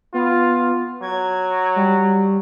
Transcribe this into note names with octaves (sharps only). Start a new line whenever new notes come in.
B3 F4
F#3 G#6
G3